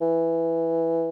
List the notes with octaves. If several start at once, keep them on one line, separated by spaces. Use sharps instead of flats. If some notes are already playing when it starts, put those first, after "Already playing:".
E3